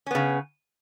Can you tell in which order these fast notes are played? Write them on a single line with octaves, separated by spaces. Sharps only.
C#4 B3 C#3